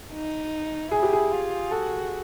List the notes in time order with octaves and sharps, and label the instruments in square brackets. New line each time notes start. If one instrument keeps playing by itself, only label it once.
[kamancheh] D#4
[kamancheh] E4 [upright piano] G#4
[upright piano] G4
G#4
[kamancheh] F4
[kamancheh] F#4 [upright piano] A4